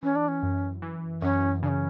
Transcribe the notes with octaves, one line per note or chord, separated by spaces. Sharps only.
E3 C#4
D4
C#4
F#2
E3
F#2 C#4
C#3 D4
C#4